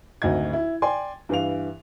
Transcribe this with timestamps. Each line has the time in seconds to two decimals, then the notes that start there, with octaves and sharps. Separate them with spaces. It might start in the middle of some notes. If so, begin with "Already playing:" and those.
0.22 G#1 D2 D#5 G#6
0.53 E4
0.82 D5 G5 G#5 C6
1.29 G2 E3 F5 F7